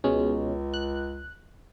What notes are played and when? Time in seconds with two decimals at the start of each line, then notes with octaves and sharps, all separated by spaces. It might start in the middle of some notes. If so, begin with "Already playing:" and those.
0.04 C#2 B2 G#3 C#4
0.74 F#6